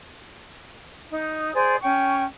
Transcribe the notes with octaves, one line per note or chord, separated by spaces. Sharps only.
D#4
G#4 C5 D5
C#4 G5 C#6